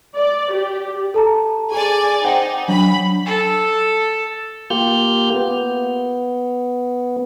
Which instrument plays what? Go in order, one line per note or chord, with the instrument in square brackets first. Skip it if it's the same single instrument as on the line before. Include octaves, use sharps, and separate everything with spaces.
[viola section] D5
G4
[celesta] A4 A5 A#5
[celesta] G#4 [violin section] D5 G#5
[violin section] D#4 [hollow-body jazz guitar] C5 G5 [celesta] F#5
[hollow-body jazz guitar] F#3 [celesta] D4 [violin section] B5
[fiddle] A4
[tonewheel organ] A#3 F4 G4 F6 G6
B3